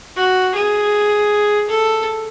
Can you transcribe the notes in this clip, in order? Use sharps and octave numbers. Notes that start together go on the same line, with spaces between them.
F#4
G#4
A4